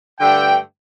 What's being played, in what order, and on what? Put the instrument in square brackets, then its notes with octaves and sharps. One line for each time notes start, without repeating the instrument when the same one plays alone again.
[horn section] G2 D3 A3 G5